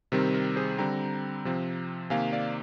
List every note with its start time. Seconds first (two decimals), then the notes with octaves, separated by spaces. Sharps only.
0.12 C3 D#3 G3 C4 A#4
0.34 A#4
0.56 G#4 C5
0.78 D3 G3 C4 G5 A#5
1.45 C3 F3 C4
2.10 C3 D#3 A#3 F5 G#5
2.32 D5 F5